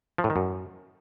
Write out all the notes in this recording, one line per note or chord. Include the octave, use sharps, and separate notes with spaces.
F3
A2
D#3
F#2